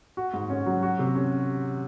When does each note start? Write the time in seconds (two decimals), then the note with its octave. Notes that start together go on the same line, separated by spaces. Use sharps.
0.17 F#4
0.34 G#2
0.50 C#4
0.66 F#3
0.83 F#4
0.99 C3
1.15 C#4